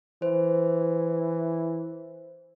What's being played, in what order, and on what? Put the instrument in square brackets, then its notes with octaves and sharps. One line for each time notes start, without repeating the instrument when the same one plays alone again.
[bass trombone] E3 [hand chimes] C5